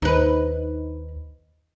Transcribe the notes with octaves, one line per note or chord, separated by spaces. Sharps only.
D#2 D#4 B4